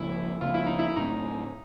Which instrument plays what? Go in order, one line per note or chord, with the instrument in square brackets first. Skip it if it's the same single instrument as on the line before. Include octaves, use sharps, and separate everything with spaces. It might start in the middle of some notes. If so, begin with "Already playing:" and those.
Already playing: [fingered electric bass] C#2 C#3 F3 A#3 [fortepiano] E4
[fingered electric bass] C#2 C#3 F3 A#3 [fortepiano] F4
[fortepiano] E4
D#4
E4
[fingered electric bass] A2 F#3 A3 C4 [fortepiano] D#4